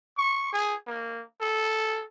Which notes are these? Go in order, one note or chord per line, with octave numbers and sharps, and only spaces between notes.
C#6
G#4
A#3
A4